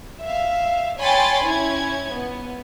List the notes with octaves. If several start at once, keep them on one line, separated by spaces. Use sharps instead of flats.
E5 F5
C#5 G5 G#5 B5 C6 A6
C#4 E4 G#6
B3